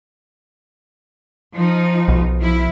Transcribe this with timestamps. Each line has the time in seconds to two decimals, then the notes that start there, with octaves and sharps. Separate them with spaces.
1.54 F3 D#4
2.08 B1
2.39 F3 E4